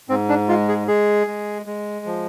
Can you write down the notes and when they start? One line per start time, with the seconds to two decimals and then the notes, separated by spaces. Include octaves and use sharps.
0.09 G#2 C4
0.29 D4
0.48 G#3 F4
0.69 G#4
0.87 G#3 G#4
1.27 G#3
1.66 G#3
2.06 F3